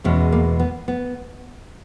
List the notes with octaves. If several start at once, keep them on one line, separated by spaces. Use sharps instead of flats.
E2 B2 G#3 C#4
A#3
B3
B3